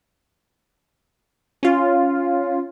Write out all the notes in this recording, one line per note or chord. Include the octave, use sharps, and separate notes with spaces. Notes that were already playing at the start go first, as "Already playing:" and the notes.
C#4 F4